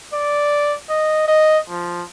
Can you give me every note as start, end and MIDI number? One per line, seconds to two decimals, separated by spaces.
0.14 0.75 74
0.90 1.26 75
1.28 1.58 75
1.70 2.03 53